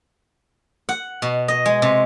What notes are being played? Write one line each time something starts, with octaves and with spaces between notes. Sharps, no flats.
F#5
B2
D#5
G#3
C3